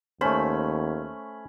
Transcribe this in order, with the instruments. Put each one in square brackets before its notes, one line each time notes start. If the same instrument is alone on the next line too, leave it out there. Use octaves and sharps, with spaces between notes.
[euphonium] D#2 [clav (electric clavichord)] A3 C5 [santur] C#4 B5